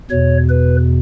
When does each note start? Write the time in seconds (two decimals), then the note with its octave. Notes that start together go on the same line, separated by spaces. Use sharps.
0.10 E2 B2 C#5
0.49 B4